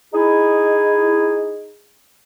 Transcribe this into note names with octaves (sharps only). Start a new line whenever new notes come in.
D#4 E4 G#4